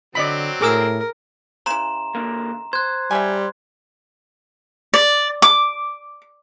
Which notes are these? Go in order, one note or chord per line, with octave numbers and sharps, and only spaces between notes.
D3 F#3 C4 D5 D#5 B5
A2 G#4 A#4 D6 E6
C#3 E3 A#5 C6 E7
D3 A#3
C5 F#6 G#6
G3 E5 G#5
D5
D6